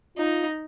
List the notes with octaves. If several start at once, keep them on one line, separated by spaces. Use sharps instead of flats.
D#4 F4